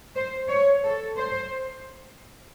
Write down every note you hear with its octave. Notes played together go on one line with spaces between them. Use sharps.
C5
C#5
A4
C5